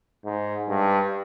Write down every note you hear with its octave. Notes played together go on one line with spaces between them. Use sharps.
G#2
G2